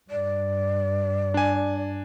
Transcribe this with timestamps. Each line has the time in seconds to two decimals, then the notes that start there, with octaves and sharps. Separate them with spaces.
0.11 G2 D5
1.34 D4 G#5